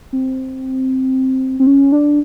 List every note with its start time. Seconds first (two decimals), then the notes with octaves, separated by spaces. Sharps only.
0.13 C4
1.60 C4
1.67 C#4
1.92 D4